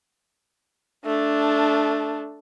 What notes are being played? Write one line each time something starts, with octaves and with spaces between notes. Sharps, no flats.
A3 D4